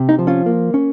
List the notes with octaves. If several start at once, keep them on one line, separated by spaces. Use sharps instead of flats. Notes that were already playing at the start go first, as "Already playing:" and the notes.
Already playing: C3
D#4
F3
C#4 F4
A#3
C#4